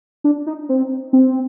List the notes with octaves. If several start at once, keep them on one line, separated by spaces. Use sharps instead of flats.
D4
D#4
C4
C4